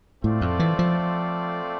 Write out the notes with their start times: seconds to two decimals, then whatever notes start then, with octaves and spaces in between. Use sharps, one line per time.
0.24 A2 A3 C4 F4 A4 D5
0.41 F2
0.59 E3
0.79 F3